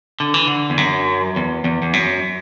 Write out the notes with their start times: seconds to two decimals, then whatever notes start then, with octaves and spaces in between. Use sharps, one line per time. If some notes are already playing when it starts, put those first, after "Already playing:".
0.20 D3
0.34 E3
0.47 D3
0.70 E2
0.78 F#2
1.36 E2
1.64 E2
1.82 E2
1.93 F#2